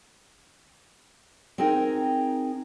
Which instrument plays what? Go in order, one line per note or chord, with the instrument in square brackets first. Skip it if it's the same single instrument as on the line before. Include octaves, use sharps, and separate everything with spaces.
[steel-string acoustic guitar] C4 D#4 G#4 A#4 G5